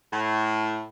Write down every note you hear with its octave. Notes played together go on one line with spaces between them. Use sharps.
A2